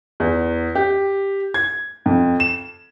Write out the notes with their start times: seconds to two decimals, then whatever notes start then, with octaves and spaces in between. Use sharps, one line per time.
0.20 E2
0.75 G4
1.54 G#6
2.06 F2
2.40 E7